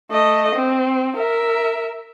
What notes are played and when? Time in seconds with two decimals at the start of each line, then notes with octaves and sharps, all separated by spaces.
0.11 A3 D#5
0.55 C4
1.17 A#4 E5